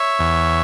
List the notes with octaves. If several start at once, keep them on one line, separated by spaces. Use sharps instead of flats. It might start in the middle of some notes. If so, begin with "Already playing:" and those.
Already playing: C#5 E5
E2